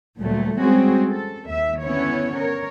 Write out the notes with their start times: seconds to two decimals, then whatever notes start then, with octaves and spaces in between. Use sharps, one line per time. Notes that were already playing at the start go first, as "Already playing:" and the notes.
0.19 D2 A#2 F#3 G3 A3
0.58 G3 G#3 C4 C#4 F#4 G#4
1.11 A4
1.48 D#2 E5
1.82 D3 B3 C#4 E4 C#5
2.38 A#4 C#5